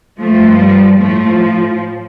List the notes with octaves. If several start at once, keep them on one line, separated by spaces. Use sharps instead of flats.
G2 F3 A3
G3
A2 F3 A3